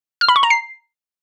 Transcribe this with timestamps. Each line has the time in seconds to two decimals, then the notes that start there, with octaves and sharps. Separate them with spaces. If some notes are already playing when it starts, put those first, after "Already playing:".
0.21 F6
0.28 B5
0.36 C#6
0.43 A#5
0.50 C7